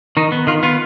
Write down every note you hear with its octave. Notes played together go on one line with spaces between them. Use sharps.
D#3 D#4
B3
D#3 F4
B3 F4